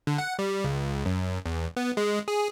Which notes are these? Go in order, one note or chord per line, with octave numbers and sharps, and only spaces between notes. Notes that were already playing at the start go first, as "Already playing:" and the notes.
D3
F#5
G3
C#2
F#2
E2
B3
G#3
G#4